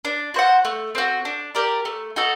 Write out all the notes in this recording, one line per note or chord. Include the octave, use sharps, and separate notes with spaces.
D4
F#4 C5 F#5
A3
C4 F#4
D4
G4 A#4 D5
A3
D#4 F#4 A4